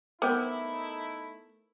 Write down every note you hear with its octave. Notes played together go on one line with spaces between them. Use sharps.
A3 B3 D#4 E4 A#4 C5 G5 D6